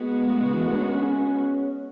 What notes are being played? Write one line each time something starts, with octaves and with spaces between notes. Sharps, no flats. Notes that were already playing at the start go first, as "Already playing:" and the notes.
Already playing: G#3 B3 F#4
A2
C#3
E3
A3
D4
C#4
C#4